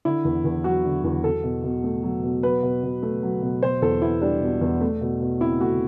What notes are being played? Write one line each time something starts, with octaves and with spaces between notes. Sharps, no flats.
D3 E4
E2
E2
F#3 F#4
D3
E2
F#3 A4
B2
B2
A3
F#3
B2
F#3 B4
B2
B2
A3
F#3
B2
B2 C5
E2 A4
B3 E4
G3 D4
B2
E2
A3
B2
B2
C4 E4
A3 F#4